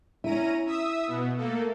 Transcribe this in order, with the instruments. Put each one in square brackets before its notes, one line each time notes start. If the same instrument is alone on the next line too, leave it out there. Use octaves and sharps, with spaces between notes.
[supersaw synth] C#4 A#5 D#7 [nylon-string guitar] E4
[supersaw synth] E5 D#6 E6
B2 B3
A3 A#3 A4